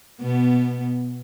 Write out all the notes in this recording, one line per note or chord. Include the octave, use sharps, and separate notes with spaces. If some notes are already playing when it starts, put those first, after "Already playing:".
B2 B3